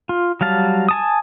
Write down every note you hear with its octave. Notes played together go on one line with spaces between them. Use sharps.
F4
F#3 G3 F5 A5
G#5 A5 D#6